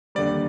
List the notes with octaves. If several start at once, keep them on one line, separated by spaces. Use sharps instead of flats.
D#2 D3 G3 D5